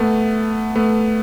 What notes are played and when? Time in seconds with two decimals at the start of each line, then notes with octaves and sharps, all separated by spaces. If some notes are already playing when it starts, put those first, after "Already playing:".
Already playing: A3 B3
0.75 A3 B3